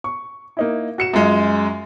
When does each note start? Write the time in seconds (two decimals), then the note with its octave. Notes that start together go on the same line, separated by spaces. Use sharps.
0.04 C#6
0.57 A#3 D#4 E4
0.98 F#4 C#7 E7
1.13 F#2 G#3 F4